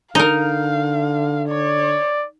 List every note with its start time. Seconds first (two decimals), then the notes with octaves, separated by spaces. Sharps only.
0.15 D3 D#4 A#4 F5
1.49 C#5 D5